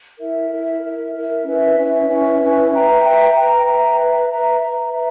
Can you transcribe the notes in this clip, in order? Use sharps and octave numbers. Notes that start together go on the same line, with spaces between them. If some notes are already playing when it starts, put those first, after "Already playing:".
E4 A#4 E5
E4 A#4 E5
E4 A#4 E5
E4 A#4 E5
C#4 E4 B4 E5
C#4 E4 B4 E5
C#4 E4 B4 E5
C#4 E4 B4 E5
B4 E5 G5 A#5
B4 E5 G5 A#5
B4 E5 G5 A#5
B4 E5 G5 A#5
B4 E5 A#5
B4 E5 A#5
B4 E5 A#5
B4 E5 A#5